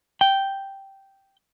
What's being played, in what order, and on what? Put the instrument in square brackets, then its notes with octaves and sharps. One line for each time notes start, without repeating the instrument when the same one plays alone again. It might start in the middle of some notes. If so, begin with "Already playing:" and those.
[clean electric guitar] G5